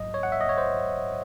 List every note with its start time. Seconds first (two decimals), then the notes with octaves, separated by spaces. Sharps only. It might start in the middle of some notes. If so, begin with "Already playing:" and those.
Already playing: G#2 F#3 D#5
0.14 C#5
0.23 F#5
0.32 E5
0.41 D#5
0.49 C#5
0.58 C5